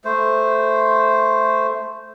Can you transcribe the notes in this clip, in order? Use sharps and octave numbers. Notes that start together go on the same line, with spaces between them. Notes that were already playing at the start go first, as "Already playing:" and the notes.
A3 C5